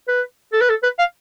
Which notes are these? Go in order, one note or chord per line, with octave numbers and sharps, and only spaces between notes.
B4
A4
B4
A4
B4
F5